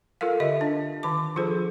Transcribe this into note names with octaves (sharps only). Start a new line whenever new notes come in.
F4 A4 A#4 F5
D3 F4 G4 D#5 E5
D4
D#3 A5 D6
F3 F4 G#4 A4 C5